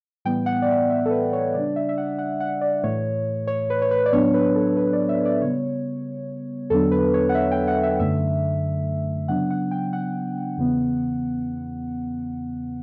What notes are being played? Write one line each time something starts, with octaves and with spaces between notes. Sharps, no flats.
A2 E3 G3 B3 G5
F#5
D5
E5
E5
A4
B4
C#5
C#3 G3 D4 D5
E5
E5
F#5
F#5
F#5
D5
A2 E3 A3 C#5
C#5
B4
C#5
B4
D5
A2 F#3 B3 D4 C#5
B4
A4
B4
D5
E5
D5
C#3 G3 B3 C#5
E2 D3 F#3 B3 D4 A4
B4
C#5
F#5
E5
G5
F#5
E5
F#2 D3 A3 E5
C#3 F#3 B3 D4 F#5
F#5
G5
F#5
E2 C#3 E3 B3